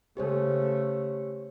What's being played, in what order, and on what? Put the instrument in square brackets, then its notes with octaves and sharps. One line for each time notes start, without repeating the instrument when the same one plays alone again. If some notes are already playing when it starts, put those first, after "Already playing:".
[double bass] C#3 A3 [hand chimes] G4 C5 C#5